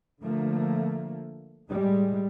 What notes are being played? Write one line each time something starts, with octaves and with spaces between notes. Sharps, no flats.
D3 F3 A3 A#3
A2 G3 G#3